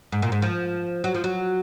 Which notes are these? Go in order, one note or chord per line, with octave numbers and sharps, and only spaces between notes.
G#2
A#2
G#2
F3
F#3
F3
F#3